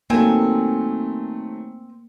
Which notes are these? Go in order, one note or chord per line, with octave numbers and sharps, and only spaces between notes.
D#3 F#3 A3 A#3 C4 G#5